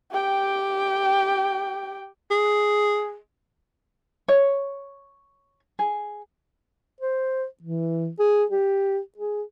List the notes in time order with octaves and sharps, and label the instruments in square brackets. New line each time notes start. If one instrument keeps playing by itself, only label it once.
[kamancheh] G4 G5
[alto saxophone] G#4
[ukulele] C#5
G#4
[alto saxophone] C5
E3
G#4
G4
G#4